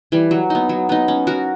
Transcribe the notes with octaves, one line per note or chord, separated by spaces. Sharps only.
E3 G3
F#3
B3 D#4
F#3
B3 D#4
C#4
F#4 A#4